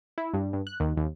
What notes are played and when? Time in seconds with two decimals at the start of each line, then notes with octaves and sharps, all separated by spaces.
0.18 E4
0.34 G2
0.53 G2
0.67 F#6
0.80 D#2
0.97 D#2